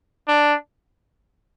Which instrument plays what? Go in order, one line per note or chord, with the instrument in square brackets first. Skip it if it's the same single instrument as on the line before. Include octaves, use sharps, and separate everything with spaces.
[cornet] D4